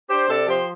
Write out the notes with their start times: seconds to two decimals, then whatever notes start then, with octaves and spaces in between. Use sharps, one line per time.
0.09 D4 G4 C5
0.28 C3 A4 D5
0.47 F3 G4 C5